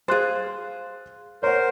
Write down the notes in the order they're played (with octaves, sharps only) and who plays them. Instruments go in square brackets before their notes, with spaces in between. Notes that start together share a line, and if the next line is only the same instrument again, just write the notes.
[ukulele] G#4 C5 [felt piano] F5 F#6 A6
[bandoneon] A#4 C5 [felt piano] C#5 F#5